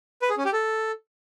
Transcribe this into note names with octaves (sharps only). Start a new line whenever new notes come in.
B4
G#4
C#4
G4
A4